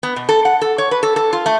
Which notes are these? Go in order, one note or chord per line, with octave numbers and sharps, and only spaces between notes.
B3
B2
A4
F#5
A4
C#5
B4
A4
A4
F4
A3